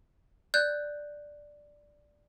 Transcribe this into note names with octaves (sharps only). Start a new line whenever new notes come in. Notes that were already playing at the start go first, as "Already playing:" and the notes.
D5 F#6 G6